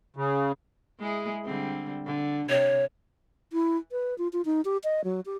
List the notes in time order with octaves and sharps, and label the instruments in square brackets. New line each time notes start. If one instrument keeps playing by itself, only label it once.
[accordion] C#3
[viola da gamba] G#3 E4 G#4
D3 G3 C4
D3
[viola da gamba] C3 [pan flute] C#5
[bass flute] E4
B4
F4
F4
D#4
G4
D#5
F#3
G4